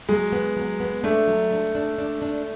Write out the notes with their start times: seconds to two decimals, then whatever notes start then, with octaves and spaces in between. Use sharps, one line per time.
0.09 F#3 G#3
0.33 B3
0.57 F#3
0.80 B3
1.04 A3 D4
1.28 F#3
1.51 D4
1.75 D4
1.98 D4
2.22 D4